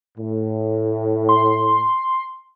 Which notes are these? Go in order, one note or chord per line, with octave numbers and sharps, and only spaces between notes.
A2
C6